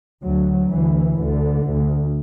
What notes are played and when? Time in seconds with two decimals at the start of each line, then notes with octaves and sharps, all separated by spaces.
0.24 D2 F#3
0.71 D2 E3
1.18 D2 D3
1.65 D2